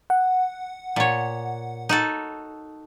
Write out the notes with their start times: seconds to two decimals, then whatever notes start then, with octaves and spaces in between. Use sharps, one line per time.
0.10 F#5
0.96 A#2 C#5
1.89 D#4 F#4 A4